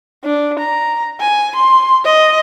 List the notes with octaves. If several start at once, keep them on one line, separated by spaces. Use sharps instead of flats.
D4
A#5
G#5
C6
D#5